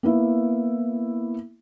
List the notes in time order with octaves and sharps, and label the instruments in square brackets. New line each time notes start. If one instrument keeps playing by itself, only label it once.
[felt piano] A#3 B3 E4